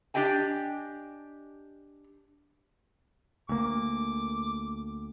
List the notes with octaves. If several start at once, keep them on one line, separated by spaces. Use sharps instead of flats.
D4 G4 D#5 G5 G#5
D2 A#3 D6